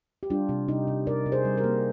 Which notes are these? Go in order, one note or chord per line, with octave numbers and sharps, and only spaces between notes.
G4
G3 D4 F4
C3
C3 D#4 G4
C3
C3 A#4 D5
C3
G#4 C5
G3
G4 A#4
A#3